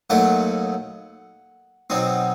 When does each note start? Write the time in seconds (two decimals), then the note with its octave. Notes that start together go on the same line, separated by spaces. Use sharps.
0.10 D#2 D#3 F#3 A3 F#5
1.90 B2 F#3 C4 D#4